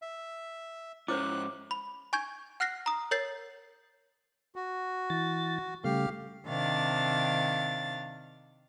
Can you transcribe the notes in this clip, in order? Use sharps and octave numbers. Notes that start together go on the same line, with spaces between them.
E5
G#2 C#4 E4 C5 C#5 D6 F#6
B5
G#5 C#6 G6 G#6
F#5 F6 F#6 A#6 C7
A#5 D#6
A#4 C#5 G6 A6 C7
F#4
E3 A6
C#3 G3 A3 G4 F5 F6
C3 D#3 D4 F5 A6